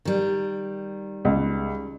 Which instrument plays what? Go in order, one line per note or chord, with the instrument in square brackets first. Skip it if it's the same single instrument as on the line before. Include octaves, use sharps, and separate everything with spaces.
[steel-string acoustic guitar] D#3 G3
[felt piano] C#2